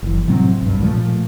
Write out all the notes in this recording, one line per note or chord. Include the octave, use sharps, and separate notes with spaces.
F#1 E3
A2 C3 F#3 C4
B1 G2
A#2 F3 G3 A3